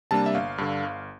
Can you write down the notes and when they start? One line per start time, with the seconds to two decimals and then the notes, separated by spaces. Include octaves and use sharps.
0.11 C3 G3 A#3 D4 A5
0.26 E5
0.35 G1 F5
0.58 G2 D3
0.83 G1